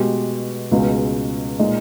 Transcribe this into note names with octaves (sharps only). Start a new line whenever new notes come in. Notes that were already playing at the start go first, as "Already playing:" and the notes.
Already playing: B2 G#3 B3 G4
C#2 B2 G#3
A#2 G#3 D#4